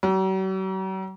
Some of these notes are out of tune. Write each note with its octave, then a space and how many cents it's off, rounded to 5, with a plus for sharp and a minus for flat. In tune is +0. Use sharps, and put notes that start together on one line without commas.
F#3 +45